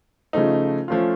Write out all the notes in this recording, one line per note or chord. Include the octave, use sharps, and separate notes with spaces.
C#3 F3 A3 D#4
F3 A3 C#4 F4